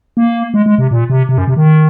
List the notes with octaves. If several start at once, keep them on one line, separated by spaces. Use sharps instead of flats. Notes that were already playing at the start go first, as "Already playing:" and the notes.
A#3
G#3
G#3
C3
A#2
C3
C3
F#2
C3
D#3